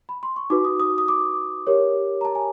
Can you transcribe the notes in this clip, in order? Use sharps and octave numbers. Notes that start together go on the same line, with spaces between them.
B5
C6
C#6
D#4 F#4 B4 D6
D#6
D#6
D#6
D6
G4 A#4 C#5
A#5
A5
G#5